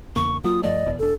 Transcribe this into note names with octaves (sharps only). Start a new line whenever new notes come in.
E2 C#3 A#3 C#6
F#3 A#3 F4 D#6
G2 F3 A3 D5 D#5
F#1 E2 B2
E1 D4 A4